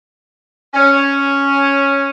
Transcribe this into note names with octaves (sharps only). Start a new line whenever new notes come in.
C#4